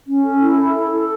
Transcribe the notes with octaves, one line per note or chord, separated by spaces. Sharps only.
C#4
A4
E4
A4
A4
A4